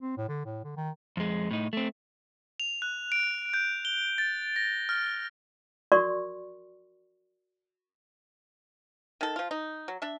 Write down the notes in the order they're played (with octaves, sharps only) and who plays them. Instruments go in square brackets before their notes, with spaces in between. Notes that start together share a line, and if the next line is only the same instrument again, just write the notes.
[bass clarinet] C4
A2
D3
A2
D3
D#3
[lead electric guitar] F2 G#3
A2 D#4
A3 C4
[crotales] F7
F#6
D7
G6
G7
A6
A#6
F6
[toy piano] F#4 A#4 D5 C6 C#6
[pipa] D#3 A4
F3 F4
D#4
F#3
D4 E5